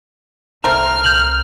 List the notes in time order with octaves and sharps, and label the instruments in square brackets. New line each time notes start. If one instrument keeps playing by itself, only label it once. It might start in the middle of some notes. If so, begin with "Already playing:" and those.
[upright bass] C2 [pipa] A3 C4 A#4 [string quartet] F6
[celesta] G6 F7 F#7